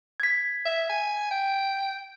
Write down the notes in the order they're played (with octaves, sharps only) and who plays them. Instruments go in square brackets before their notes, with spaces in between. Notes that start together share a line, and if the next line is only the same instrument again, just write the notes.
[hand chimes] G#6 B6
[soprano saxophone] E5
G#5
G5